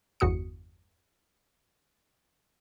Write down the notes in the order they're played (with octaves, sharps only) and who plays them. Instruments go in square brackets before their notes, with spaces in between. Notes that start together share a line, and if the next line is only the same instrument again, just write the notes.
[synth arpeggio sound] G1 E2 F#4 D#6 C#7